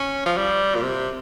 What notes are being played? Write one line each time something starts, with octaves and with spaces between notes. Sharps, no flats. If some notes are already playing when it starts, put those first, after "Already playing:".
Already playing: C#4
F3
G3
A#2
C3